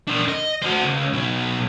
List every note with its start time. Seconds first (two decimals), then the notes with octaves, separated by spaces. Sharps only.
0.08 D4 A#4
0.28 D#5
0.62 F#4 C5
0.84 C#2
1.13 B2 F#3